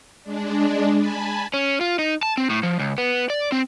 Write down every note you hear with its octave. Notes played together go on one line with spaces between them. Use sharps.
G#3 D4
G#5 A5 B5
C#4
F4
D#4
A5
C4
A2
F3
C#2
B3
D5
C4